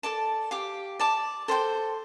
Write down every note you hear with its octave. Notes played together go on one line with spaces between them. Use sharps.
A4 D5 A5
G4 F5 D6
D5 A5 D6
A4 C5 G5 C6